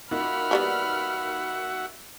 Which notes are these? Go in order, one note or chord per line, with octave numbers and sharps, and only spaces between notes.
A#3 D#4 F4 F#4 E5 F#5 B5 F6
F3 G3 B3